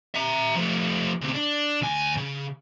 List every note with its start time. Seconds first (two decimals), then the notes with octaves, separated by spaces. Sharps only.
0.15 E5 A#5
0.55 F3 A3
1.22 D2 C3
1.34 D4
1.82 D2 G#5
2.18 C#3